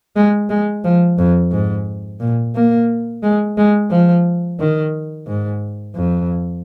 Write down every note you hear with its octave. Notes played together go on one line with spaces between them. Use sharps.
G#3
G#3
F3
F2
G#2
A#2
A#3
G#3
G#3
F3
D#3
G#2
F2